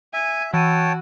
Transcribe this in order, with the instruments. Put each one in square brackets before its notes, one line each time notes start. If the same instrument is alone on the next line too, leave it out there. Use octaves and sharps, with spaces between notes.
[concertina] E5 [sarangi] G#5
[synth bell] E3 D#7 [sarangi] F#4 [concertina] C#5 G5 A5